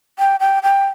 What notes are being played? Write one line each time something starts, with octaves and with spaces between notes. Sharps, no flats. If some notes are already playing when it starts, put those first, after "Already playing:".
G5
G5
G5